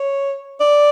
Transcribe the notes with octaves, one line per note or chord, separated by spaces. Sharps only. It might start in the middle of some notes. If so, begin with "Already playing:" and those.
Already playing: C#5
D5